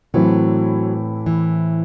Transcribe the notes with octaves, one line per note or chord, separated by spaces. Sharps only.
A2 E3 F#3 C4 E4
E3